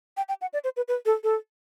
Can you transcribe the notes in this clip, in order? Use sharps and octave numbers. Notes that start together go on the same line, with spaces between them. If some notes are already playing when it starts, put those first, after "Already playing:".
G5
G5
F#5
D5
C5
B4
B4
A4
A4